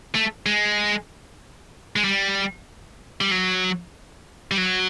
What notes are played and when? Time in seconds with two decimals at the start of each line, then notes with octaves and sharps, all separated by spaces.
0.15 A3
0.46 G#3
1.96 G#3
2.04 G3
3.21 G3
3.31 F#3
4.51 G3
4.58 F#3